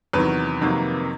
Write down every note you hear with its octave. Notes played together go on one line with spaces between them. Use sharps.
E2 C3 D#3 F#3 B4
F2 C3 D#3 F#3 A#3